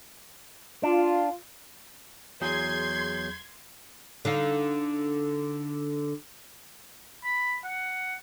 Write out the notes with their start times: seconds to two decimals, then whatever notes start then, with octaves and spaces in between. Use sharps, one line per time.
0.83 D4 F4
2.41 E2 F#3 G#4 C6 G6 G#6
4.25 D3 D#4 F5
7.24 B5
7.64 F#5